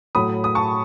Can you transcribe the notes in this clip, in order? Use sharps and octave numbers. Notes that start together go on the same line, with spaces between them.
A2 F#3 A3 B5 D#6
D#6
A5 C#6